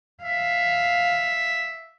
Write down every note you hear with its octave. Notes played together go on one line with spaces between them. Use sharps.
E5 F5